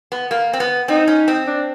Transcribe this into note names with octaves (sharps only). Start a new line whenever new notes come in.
B3
A#3
C4
B3
C4 D#4
C#4
C4
D4